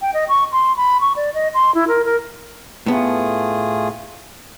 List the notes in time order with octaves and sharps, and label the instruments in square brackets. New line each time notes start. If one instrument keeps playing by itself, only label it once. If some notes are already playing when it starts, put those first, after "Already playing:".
[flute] G5
D#5
C#6
C6
B5
C#6
D5
D#5
C6
E4
A#4
A#4
[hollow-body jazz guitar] A2 B3 [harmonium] A3 F4 G#4